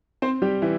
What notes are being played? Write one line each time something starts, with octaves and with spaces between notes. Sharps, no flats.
C4 C5
G3 G4
E3 E4